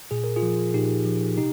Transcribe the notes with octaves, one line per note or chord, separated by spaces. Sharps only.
A#2 G#4
A#4
F4 G#4
F3
A#2 D#4 G4
F3
C3 D#4 G4